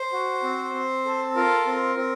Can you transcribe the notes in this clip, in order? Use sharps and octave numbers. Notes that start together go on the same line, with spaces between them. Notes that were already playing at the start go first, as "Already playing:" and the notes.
Already playing: C5
F#4
C4
C4
A4
F4 A#4
C4
C4